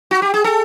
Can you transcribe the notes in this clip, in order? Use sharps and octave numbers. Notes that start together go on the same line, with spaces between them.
F#4
G4
G#4
A4